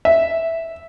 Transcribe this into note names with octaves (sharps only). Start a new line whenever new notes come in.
E5